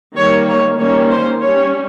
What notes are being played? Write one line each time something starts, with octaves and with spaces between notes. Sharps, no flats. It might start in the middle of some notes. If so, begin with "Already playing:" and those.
D#3 G3 A#3 C#5
C#5
D#3 G3 A#3 C#4 C#5
C5
G3 C#4 C#5